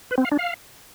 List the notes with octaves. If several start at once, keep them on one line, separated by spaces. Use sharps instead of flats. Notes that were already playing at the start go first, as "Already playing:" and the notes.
B4
C4
F5
D4
F5